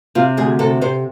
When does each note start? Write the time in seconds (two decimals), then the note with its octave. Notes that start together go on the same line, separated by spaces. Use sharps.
0.15 C3 F4
0.37 D2 G#4
0.59 C3 A4
0.81 C3 C5